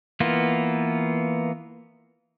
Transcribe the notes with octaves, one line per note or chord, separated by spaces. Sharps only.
E3 A#3 B3 F4